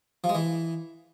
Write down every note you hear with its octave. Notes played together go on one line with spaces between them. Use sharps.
F3
G#3
E3